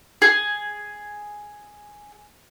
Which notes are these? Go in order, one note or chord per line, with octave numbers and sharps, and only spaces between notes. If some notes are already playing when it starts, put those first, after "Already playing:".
G#4